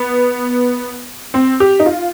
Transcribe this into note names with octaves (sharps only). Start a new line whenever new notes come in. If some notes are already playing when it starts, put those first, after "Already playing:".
Already playing: B3
C4
G4
D#4
F4